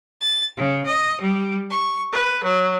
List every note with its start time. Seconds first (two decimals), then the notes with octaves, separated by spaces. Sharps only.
0.21 A6
0.56 C#3
0.86 D#5
1.20 G3
1.69 C#6
2.12 B4
2.44 F#3